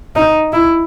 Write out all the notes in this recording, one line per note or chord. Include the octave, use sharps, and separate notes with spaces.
D#4
E4